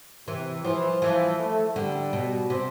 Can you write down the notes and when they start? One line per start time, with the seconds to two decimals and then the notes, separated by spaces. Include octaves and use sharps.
0.28 C3 E3
0.64 E3 F3
1.02 E3 F3
1.39 A3
1.76 D3 G3
2.13 B2
2.50 C3